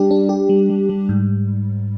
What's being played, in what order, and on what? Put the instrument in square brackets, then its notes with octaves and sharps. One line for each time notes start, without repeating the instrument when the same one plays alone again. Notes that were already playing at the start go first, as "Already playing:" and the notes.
Already playing: [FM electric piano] G3 D4 G4
D4
G4
G3
G3
G3
G#2